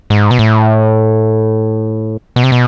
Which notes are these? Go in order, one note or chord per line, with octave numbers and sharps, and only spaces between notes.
G#2
B2
A2
B2
C3
B2